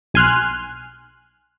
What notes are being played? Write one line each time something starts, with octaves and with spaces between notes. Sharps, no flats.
B1 G#5 C6 F6 F#6